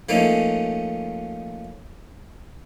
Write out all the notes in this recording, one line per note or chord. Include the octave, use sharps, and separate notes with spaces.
F3 A3 A#3 C#4 D#4